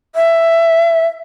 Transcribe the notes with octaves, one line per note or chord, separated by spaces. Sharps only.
E5